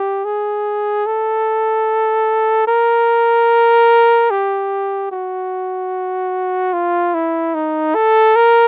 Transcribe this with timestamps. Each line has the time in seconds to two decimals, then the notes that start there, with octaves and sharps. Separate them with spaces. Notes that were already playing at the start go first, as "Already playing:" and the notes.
Already playing: G4
0.24 G#4
1.06 A4
2.67 A#4
4.31 G4
5.12 F#4
6.73 F4
7.14 E4
7.55 D#4
7.95 A4
8.36 A#4